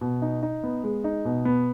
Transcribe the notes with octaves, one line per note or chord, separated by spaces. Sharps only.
B2
D#4
D#4
B3
G#3
D#4
B2
B3